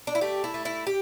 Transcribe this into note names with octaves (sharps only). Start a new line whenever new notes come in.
D4
E4
A3 G4
E4
A3
E4
G4